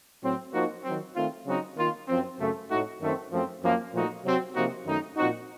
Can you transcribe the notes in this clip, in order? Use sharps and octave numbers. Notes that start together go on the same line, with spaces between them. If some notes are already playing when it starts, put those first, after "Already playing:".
A2 F#3 C4
F3 A#3 D#4 F#4
D#3 F#3 C4
D#3 A3 C4 F4
C#3 F#3 C4 D#4 F#4
D#3 A#3 F4
F#2 F3 C4
F#2 C#3 A3
A2 A3 D#4 F#4
F#2 D#3 A3 C4
F#2 F3 A3 C4
F#2 F3 A#3 F4
A#2 F3 A3 D#4 F#4
C3 F#3 C4 F#4
C3 F3 A#3 D#4 F#4
F#2 D#3 A3 D#4
A#2 F3 C4 D#4 F#4